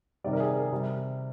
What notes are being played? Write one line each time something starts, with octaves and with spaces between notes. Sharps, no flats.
C3 D#3 G3 D5
A#4
G#4
A#4
C3 G3